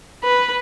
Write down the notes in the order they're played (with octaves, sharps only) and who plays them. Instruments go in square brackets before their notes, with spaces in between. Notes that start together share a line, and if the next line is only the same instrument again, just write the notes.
[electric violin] B4